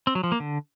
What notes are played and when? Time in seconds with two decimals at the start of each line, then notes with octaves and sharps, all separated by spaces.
0.07 C4
0.15 F#3
0.24 F3
0.32 A#3
0.40 D3